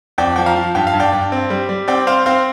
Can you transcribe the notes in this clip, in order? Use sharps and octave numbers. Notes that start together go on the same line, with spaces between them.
F2 D5 G5
F3 G5
F5 A#5
F3
G2 G5
F5
G2
D5 G5
G2
C4
G3
G3
C4 D5 G5
C4 C5 F5
C4 C5 F5